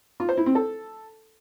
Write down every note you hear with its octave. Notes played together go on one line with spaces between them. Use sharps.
F4
C5
E4
C4
A4